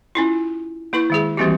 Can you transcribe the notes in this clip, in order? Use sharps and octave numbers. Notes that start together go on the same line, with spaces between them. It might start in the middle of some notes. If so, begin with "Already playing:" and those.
C#4 E4 F4
A#3 E4 B4 C#6
D#3 G#3 G#4
E3 G3 A#3 C4 F#4 G4